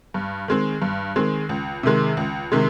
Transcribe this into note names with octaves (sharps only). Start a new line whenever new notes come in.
G2
D#3 G#3 C4
G2
D#3 G#3 C4
C#2
C3 D#3 G#3
C#2
C3 D#3 G#3